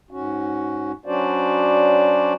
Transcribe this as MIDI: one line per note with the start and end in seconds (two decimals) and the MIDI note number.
0.11 0.92 44
0.11 0.92 61
0.11 0.92 66
1.06 2.33 54
1.06 2.33 61
1.06 2.33 62
1.06 2.33 66
1.06 2.33 72
1.06 2.33 74